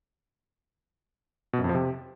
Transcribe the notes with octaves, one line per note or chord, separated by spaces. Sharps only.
B2
F#2
F2
F3
C3